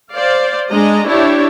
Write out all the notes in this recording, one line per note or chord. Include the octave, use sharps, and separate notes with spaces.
C5 D5 F5
G#3 D4 D#5 A#5
D4 E4 G4 C#5